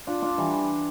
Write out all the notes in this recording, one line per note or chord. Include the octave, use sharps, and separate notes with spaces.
D4 F4
D4 F4
E3 G3